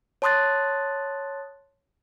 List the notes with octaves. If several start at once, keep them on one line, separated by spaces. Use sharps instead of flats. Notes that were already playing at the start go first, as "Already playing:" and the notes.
C#5 A5 C6 D#6 F#6 A6